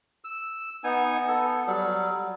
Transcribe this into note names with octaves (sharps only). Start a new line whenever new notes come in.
E6
B3 D#4 G#5
B3 A4
F#3 G3